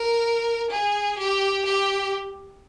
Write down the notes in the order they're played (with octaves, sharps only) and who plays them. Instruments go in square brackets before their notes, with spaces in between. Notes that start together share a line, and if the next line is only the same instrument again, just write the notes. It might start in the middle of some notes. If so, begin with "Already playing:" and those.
Already playing: [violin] A#4
G#4
G4
G4